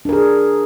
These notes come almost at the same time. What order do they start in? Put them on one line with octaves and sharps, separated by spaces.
D4 A#4 G#4